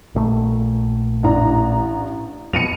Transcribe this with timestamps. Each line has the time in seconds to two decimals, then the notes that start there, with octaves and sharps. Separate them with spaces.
0.15 A#1 A#2 A3
1.23 A1 D4 A#5
2.53 F2 B2 C#7 D#7 F7